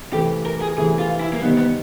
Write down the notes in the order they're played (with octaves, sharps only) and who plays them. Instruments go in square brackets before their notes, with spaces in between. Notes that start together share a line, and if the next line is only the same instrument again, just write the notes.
[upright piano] C3 E3 A3 [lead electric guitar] G4
[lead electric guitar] A#4
G#4
[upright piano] C3 E3 A3 [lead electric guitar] G#4
[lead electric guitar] F4
E4
A#3
[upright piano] C3 D#3 G3 C4 D#4 [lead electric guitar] B3
[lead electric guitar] B3